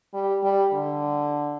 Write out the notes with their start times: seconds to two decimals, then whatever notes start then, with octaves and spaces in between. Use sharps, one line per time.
0.14 G3
0.43 G3
0.73 D3